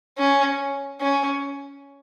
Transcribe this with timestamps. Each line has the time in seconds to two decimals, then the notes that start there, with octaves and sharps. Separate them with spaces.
0.18 C#4
1.00 C#4